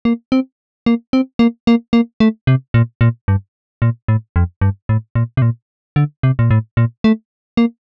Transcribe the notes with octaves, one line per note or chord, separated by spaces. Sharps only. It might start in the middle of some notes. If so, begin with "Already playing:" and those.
A#3
C4
A#3
C4
A#3
A#3
A#3
A3
C3
A#2
A#2
G2
A#2
A2
F2
G2
A2
A#2
C3
A#2
D3
C3
A#2
A2
A#2
A3
A#3